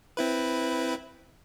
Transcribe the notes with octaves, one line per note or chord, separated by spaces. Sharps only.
C4 E4 B4